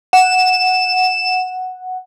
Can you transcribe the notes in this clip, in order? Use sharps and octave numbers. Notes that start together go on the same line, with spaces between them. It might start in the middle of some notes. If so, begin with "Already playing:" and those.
F#5 E7